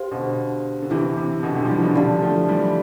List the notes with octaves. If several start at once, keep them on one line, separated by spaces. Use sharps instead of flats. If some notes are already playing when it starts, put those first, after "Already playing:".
Already playing: G4 C5 F5
B2 D3
D3
C3 E3 C4 E4 G4
C3
B2 D3
C3 E3
F3
E3 G3
B2 D3
D3 F3 G4 D5 F5 A5
F3 A3
E3 G3